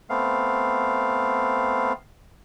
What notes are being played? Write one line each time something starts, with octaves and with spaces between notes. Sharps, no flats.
A3 B3 C4 F5